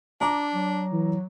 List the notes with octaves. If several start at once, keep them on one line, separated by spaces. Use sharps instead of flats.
D4 A#5 D6
F#3
E3